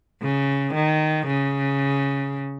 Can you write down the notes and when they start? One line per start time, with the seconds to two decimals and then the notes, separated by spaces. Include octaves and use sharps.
0.22 C#3
0.74 D#3
1.27 C#3